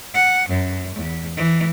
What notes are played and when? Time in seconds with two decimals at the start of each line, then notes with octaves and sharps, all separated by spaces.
0.14 F#5
0.49 F#2
0.95 E2
1.36 E3